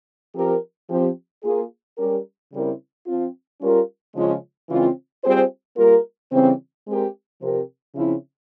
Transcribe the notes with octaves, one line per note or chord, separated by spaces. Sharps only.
F3 C4 G4 A#4
F3 C4 G4
A#3 F4 G#4
G3 C#4 G4 A#4
C#3 G3 C4 E4 A#4
F3 C4 F4
G3 C#4 F4 A#4
C#3 F3 G#3 C#4 F4
C#3 E3 G#3 C4 F4
G3 C4 F4 G#4 C5
G3 A#3 F4 A#4
C#3 E3 G3 C4
G#3 C4 G4 A#4
C3 F3 C4 G4 A#4
C#3 F3 C4 E4